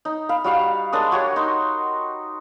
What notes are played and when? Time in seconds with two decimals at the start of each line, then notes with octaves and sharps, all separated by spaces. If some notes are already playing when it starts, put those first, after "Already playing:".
0.05 D#4
0.29 F5 B5
0.44 G3 F#4 F5
0.93 G#3 D4 A#4 D#6
1.12 F#4 G4 C#5 F#5
1.36 D#4 C6